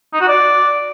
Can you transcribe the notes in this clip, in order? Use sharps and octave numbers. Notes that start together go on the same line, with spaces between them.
D#4
F#4
D5